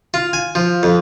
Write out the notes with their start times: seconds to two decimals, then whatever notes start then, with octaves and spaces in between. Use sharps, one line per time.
0.14 F4
0.33 G#5
0.55 F3
0.83 F2